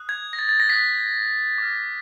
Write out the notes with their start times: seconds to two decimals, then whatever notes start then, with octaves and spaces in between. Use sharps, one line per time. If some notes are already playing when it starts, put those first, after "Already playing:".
Already playing: D#6 F#6
0.09 G#6
0.33 A#6
0.39 A6
0.49 A6
0.60 A#6
0.69 D#6 F#6 B6
1.58 D6 F6